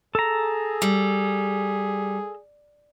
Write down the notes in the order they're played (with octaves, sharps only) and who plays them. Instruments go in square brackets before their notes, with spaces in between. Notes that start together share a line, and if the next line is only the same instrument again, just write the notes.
[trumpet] G#4 [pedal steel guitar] A4 A#5
[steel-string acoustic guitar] G3